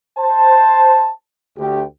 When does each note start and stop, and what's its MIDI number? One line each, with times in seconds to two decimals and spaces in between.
0.18 1.10 72
0.18 1.10 81
1.57 1.82 38
1.57 1.82 67